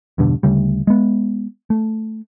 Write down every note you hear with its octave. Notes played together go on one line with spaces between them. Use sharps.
E2 G2 B2 D3
D2 C#3 G3
G#3 B3
A3